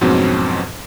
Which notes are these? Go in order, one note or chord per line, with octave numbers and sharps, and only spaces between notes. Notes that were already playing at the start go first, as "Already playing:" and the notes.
F2 G#2 B2 F#3 C4 C#4